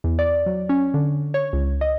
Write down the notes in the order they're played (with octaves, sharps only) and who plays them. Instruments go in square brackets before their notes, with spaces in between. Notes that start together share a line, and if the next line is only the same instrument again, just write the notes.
[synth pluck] E2
D5
F#3
C#4
D3
C#5
C#2
D#5